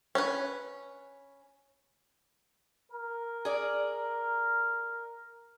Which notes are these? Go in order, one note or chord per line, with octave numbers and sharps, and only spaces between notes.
C#4 B4
A#4
G#4 D5